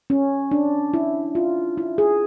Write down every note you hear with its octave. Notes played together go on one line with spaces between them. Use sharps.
C#4
D4
E4
F4
E4
G#4